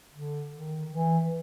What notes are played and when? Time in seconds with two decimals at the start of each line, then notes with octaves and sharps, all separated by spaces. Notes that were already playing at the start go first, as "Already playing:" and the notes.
0.14 D3
0.53 D#3
0.91 E3